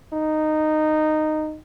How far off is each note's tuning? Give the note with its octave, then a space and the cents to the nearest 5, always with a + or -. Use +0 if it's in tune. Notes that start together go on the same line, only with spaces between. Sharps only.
D#4 -10